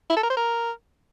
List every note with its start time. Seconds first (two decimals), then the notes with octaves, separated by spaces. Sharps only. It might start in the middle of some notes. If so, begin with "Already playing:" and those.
0.10 E4
0.16 A4
0.23 A#4
0.30 C5
0.37 A#4